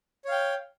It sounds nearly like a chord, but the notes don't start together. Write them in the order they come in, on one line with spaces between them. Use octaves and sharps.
C#5 F5 G5